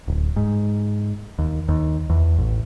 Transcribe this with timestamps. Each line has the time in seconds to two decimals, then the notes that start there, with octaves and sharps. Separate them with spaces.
0.08 D1
0.36 G#2
1.39 D#2
1.69 D#2
2.10 E2
2.38 A1